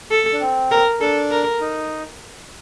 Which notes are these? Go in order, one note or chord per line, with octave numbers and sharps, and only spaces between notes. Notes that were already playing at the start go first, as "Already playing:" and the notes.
A4
D4
C4
A#4
D4 A4
A#4
D#4